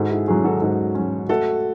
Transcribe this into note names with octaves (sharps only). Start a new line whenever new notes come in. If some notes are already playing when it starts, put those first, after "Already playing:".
Already playing: G#2 F#4 A4
E4 G#4
F#3 C#4 E4 G#4
F#4 A4
G#2
F#3 C#4
A3 F#4 A4